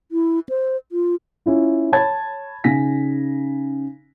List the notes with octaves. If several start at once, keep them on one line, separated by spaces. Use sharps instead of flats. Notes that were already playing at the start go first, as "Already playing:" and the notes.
E4
C5
F4
C#4 E4 F4
C#5 A5 B5 G#6 A6
C#3 D#4 G#5 A#6 B6